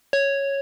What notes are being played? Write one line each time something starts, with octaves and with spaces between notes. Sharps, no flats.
C#5